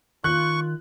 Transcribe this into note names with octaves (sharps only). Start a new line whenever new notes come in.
D#3 F4 C#6 F#6